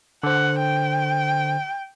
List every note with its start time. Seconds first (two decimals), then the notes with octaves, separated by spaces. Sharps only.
0.23 D3 C5 F#5
0.59 G5